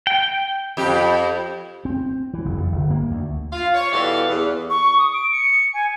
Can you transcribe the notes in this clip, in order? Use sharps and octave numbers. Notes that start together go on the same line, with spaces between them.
G5
F2 G4
C4
E3
F#1
F2
G1
A#3
D2
F4 F5
C#5
B2 E3 G3 G4 A4 F5
E2
C#6
D#6
D7
C#7
G#5